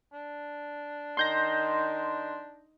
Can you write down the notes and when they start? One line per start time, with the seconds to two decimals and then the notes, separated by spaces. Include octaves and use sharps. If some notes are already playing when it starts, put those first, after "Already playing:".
0.13 D4
1.17 D#3 C6 G6 A#6